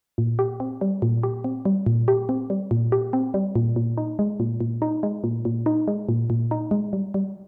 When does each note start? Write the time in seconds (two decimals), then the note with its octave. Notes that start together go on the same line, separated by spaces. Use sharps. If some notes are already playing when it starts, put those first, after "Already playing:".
0.18 A#2
0.39 G4
0.60 C4
0.81 G3
1.02 A#2
1.23 G4
1.44 C4
1.65 G3
1.86 A#2
2.08 G4
2.29 C4
2.50 G3
2.71 A#2
2.92 G4
3.13 C4
3.34 G3
3.56 A#2
3.76 A#2
3.98 D#4
4.19 G#3
4.40 A#2
4.61 A#2
4.82 D#4
5.03 G#3
5.24 A#2
5.45 A#2
5.66 D#4
5.88 G#3
6.09 A#2
6.30 A#2
6.51 D#4
6.71 G#3
6.93 G3
7.14 G3